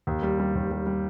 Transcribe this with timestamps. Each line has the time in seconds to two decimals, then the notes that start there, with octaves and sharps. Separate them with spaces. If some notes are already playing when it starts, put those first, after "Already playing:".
0.07 D#2
0.23 G3
0.40 G3
0.55 D#2
0.71 G3
0.87 G3